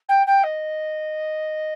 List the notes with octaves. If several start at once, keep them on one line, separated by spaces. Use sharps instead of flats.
G5
G5
D#5